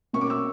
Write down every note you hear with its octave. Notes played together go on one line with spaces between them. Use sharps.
B2 A#3 C#4 C#6
D6
E6